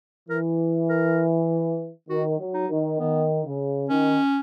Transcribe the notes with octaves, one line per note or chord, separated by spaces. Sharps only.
E3 A#4
A#4
D#3 F#4
F#3
D#4
D#3
D#3 B3
C#3
D#3 C#4